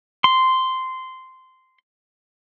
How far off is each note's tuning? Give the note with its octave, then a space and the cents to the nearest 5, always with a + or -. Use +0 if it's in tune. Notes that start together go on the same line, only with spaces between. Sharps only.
C6 -10